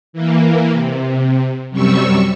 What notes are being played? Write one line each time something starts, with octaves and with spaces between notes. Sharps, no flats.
E3 A#3
C3
F#2 C3 G3 C#6 E6